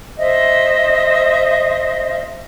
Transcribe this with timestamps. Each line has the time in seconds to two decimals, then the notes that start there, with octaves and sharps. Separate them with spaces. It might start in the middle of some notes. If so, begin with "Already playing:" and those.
0.18 C5 D#5 E5